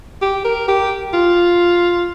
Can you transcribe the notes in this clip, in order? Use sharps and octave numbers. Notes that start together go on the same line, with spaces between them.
G4
A#4
G4
F4